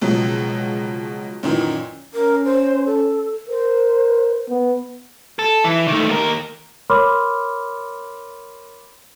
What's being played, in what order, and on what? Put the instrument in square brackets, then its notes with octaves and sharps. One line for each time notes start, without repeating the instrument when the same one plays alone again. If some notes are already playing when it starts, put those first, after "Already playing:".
[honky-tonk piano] C#2 B2 F3 F#3
F#2 A#2 D#3 E3
[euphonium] C#4 [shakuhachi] A#4
[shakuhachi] C5
A4
[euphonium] A#4 [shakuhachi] C5
[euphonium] B3
[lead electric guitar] A4
E3
D#3 A3
D#2 A#4
[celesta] A#4 C#5 B5 C6 D6 F6